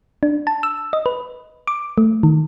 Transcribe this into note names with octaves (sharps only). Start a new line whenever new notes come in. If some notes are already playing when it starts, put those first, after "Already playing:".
D4
A5
E6
D#5
B4
D6
A3
D#3